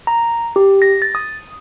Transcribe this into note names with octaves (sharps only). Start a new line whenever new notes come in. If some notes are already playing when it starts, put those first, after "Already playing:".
A#5
G4
A#6
A6
D#6